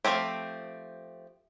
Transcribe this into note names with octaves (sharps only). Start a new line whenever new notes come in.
F3 A3 C4 G4